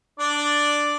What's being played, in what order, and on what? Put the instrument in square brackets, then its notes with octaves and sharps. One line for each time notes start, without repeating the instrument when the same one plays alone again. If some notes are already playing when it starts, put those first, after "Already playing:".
[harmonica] D4 D5